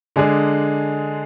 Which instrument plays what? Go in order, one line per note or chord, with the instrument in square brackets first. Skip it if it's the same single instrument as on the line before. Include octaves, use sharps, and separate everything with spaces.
[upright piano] D3 G#3 D4 G#4